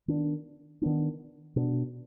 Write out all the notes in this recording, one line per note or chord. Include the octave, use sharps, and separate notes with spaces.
D#3 B3 D4
D#3 B3 D4
B2 B3 D4